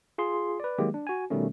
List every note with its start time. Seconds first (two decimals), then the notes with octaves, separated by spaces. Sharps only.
0.18 F4 G#4 C6
0.60 B4 D5
0.78 D#3 F#3 G#3 A#3 G4
0.94 D4
1.07 F#4 G#5
1.30 B2 D#3 G3 A3 C#4